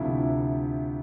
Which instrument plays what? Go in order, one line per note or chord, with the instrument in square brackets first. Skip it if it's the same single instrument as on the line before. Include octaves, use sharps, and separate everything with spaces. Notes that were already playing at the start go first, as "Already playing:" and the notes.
Already playing: [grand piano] D2 C3 F3 E4